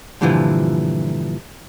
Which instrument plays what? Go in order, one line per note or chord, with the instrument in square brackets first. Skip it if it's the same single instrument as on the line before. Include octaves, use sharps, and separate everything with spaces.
[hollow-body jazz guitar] G2 A#2 D3 E3 F3